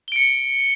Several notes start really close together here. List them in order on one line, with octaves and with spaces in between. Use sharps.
G7 D7 C#7